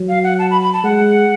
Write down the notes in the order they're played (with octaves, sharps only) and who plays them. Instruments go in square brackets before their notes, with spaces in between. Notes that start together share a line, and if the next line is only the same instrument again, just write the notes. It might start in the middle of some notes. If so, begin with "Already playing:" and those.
Already playing: [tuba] F#3
[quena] F5
F#5
A5
B5
B5
A5
[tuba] G#3 [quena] F#5